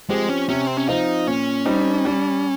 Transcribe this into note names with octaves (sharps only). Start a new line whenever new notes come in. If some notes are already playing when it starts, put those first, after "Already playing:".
F3 G#3 C4 G4
C#4
C3 C#4
C4
C#4
F3 C4 D#4 F4
A#2 C#4
G3 C4 D#4
G3